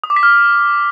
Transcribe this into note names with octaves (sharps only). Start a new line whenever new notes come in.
D#6
D6
B6
F6